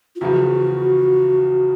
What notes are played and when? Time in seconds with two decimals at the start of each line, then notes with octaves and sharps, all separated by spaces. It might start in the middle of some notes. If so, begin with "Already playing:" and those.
0.15 F4
0.21 E2 C#3 F3 F#4